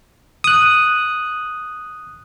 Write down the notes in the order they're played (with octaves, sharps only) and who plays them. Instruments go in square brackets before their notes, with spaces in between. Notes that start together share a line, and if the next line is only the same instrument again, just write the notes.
[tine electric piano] D#6 F#6